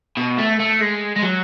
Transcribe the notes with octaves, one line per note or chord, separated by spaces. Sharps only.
B2
A3
A3
G#3
G#3
F#3